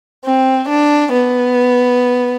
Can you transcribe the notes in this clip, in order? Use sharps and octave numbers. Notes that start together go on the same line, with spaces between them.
C4
D4
B3